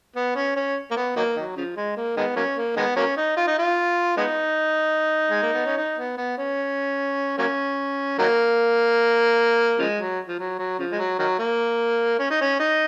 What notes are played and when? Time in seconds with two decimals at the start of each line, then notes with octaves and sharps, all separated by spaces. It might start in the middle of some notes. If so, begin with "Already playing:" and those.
0.16 B3
0.36 C#4
0.56 C#4
0.91 A#3
0.96 B3
1.16 D#3 F#3 A#3
1.36 D#3 F#3
1.56 C#3 F3
1.76 G#3
1.96 A#3
2.17 D#3 G#3 B3
2.36 F#3 A#3 C#4
2.57 A#3
2.76 D#3 G#3 B3
2.96 F#3 A#3 C#4
3.17 D#4
3.37 F4
3.47 D#4
3.58 F4
4.17 G#3 B3 D#4
5.30 G#3
5.42 A#3
5.54 B3
5.65 C#4
5.77 D#4
5.98 B3
6.17 B3
6.38 C#4
7.38 F#3 A#3 C#4
8.18 D#3 F#3 A#3
9.78 C#3 F3 G#3
9.99 F#3
10.27 F3
10.38 F#3
10.59 F#3
10.79 C#3 F3
10.91 G#3
10.98 F#3
11.19 D#3 F#3
11.39 A#3
12.19 C#4
12.30 D#4
12.41 C#4
12.59 D#4